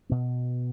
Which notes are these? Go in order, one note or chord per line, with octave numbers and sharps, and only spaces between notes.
B2 B3